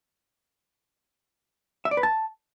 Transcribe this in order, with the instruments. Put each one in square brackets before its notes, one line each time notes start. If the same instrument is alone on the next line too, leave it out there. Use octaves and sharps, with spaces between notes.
[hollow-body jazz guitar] E5
D5
B4
A5